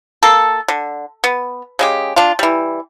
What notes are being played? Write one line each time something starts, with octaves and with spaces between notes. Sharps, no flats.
A#3 A4
D3
B3
C#3 G#3 G4
D4 F4
E3 G3